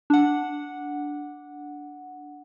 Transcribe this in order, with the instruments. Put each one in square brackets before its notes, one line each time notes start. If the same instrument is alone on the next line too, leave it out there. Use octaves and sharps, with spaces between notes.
[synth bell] D4 F#5